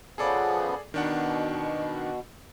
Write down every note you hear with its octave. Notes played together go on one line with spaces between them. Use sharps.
C#3 F3 B3 G#4 A4 D5
B2 D#3 D4 F#5